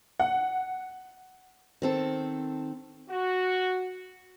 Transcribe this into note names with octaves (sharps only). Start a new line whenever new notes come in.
F#5
D#3 C4 A4
F#4